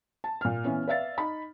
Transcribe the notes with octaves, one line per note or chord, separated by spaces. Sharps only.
A5
A#2 F6
E3 B3 C#4
B4 D5 E5 F5 A6
D#4 B5